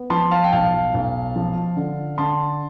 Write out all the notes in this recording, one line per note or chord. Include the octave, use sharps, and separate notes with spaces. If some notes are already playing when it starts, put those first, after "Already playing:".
Already playing: B3
F3 A5 C6
F5 A5
G5
B1 F5 A5
B1
F3
D3
D3 A5 C6